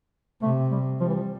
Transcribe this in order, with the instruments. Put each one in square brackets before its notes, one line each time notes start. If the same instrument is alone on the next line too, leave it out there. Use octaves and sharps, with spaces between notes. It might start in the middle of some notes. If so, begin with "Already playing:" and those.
[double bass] C3 [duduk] A3
[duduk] G3
[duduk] F3 [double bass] G3
[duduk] E3
F3